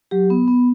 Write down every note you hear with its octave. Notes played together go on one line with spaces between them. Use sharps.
F#3 G4
B3
B3